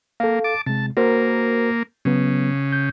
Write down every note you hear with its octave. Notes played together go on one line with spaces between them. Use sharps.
A#3 A4 F5
A5 D6
C3 G#3 A5
A#3 F#4 A#4 C5
C#3 F#3 B3
G6